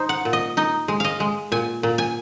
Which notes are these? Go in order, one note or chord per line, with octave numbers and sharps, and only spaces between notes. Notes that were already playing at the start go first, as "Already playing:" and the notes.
Already playing: D#4 C5
F#5
A#2
D#5
D#4 D#5
G#3
D#5 F5
G#3
A#2 G#5
A#2
G#5